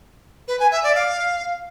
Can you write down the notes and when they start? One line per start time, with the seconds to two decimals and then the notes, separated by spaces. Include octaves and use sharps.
0.48 B4
0.60 G#5
0.72 E5
0.83 D5
0.95 F5